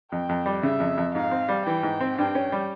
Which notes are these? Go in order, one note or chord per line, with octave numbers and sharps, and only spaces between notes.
F2 G5
F2
G3
C#3 E5
F2
F2
G#2 F5
C4
G3
E3 G5
G#2
C4
G2 G5
C#4
G3